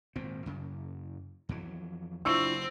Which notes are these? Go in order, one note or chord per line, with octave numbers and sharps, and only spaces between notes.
G#1 A#2 C4
F#2 C#3
F2 E3 F#3
F#1 F#3 C4 D4 E4 F4 C#6 E6